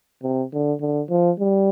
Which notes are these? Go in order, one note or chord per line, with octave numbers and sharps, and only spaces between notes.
C3
D3
D3
F3
G3